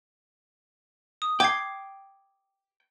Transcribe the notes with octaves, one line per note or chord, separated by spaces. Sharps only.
D#6
G5 D6 G#6 C7